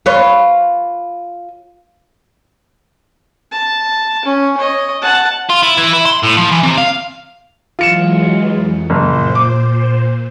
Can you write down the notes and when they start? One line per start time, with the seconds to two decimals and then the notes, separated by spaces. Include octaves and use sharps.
0.06 F4 B4 C#5
3.52 A5
4.25 C#4
4.57 C#5 D#5
5.02 F#5 A5
5.49 F4
5.63 E4
5.77 E3
5.93 E4
6.06 C6
6.24 A2
6.38 F3
6.52 E3
6.63 C3
6.78 F5
7.79 E3 F#3 G#3 F4 C#7 E7
8.54 F2
8.90 F#1 A#2 C5
9.35 D6